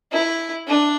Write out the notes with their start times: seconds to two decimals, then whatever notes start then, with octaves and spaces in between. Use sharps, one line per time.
0.12 E4
0.67 D4